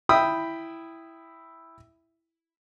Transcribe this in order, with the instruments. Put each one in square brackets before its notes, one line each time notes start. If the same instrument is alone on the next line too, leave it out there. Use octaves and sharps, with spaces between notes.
[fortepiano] E4 E5 G5 B5 D#6 E6